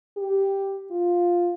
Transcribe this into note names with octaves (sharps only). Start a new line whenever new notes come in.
G4
F4